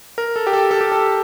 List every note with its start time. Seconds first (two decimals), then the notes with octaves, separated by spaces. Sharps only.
0.18 A#4
0.36 A4
0.47 G4
0.53 A4
0.71 A4
0.81 G4
0.92 A4